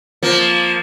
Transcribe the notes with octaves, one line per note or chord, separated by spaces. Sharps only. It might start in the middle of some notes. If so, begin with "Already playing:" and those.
F3 A#3